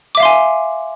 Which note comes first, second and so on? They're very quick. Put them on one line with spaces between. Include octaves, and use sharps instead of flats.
D6 E5 F5 C6 G#5